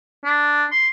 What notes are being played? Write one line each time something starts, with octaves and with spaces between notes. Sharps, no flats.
D4
C6